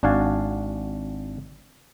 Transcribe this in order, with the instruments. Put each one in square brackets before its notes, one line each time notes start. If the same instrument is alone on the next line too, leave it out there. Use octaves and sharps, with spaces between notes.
[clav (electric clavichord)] G#1 D4 F#4 F5 G#5 A5